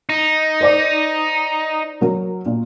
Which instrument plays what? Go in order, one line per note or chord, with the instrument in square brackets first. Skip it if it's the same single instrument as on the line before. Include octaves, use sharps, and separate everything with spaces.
[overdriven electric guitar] D#4
[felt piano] C5 D5 D6
F#3 A#4
A#2